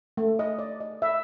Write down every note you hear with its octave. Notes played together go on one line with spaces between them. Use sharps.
A3
D#5
D5
D#5
E5